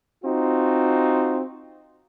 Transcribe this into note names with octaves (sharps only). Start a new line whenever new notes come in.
C4 D#4 F4 F#4